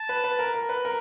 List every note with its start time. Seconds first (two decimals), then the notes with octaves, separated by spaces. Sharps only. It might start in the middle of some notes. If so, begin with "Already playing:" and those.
Already playing: A5
0.09 B4
0.24 B4
0.39 A#4
0.54 A#4
0.69 B4
0.85 A#4